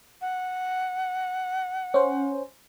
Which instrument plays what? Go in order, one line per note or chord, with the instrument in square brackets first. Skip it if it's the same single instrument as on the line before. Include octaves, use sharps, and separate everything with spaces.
[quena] F#5
[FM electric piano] C#4 C5